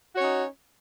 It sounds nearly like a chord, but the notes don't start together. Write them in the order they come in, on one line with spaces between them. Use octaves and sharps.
F#4 C#5 C#4 D#4